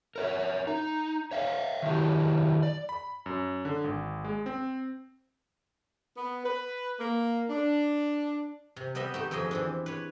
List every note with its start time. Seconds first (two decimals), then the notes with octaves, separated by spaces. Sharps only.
0.16 A#4 C#5 E5
0.67 D#4
1.31 C#5 E5 F5
1.82 D#3 F#3 E4 G4
2.63 D5
2.89 B5
3.26 F#2
3.65 D3
3.84 G#1
4.24 G#3
4.46 C4
6.16 B3
6.44 B4
6.99 A#3
7.50 D4
8.76 C3
8.95 G3 B3 G4 D#5 E5
9.14 A3 D#4 G4
9.31 F2 F3 G#4 D#5 E5
9.51 E3 C4 D4
9.86 B4 C#5